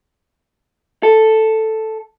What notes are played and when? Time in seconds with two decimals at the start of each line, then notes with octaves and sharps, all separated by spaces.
1.03 A4